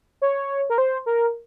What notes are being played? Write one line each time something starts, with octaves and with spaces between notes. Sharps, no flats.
C#5
A#4
C5
A#4